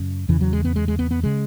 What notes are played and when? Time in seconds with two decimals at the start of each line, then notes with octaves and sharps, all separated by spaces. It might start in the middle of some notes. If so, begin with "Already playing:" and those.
Already playing: F#2 C#3
0.29 E2 C#3 E3
0.41 F#3
0.53 G#3
0.65 B3
0.76 G#3
0.88 G#3
0.99 B3
1.11 B3
1.24 C#3 G#3